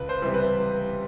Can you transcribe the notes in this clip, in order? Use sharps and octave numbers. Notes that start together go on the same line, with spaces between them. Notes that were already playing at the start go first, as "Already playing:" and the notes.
Already playing: C#2 B4
C5
C3 E3 G3
B4